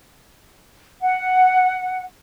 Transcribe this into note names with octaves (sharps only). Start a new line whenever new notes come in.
F#5